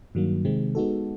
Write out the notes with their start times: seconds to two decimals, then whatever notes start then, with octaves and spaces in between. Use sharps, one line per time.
0.15 G2 D#3 F#3 A#3
0.45 C3 D#3 G#3 C4
0.75 G#3 B3 D#4 F#4 A4